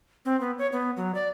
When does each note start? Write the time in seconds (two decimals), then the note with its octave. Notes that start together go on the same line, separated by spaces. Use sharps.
0.25 C4
0.41 B3
0.58 C#5
0.72 B3
0.97 F#3
1.15 D5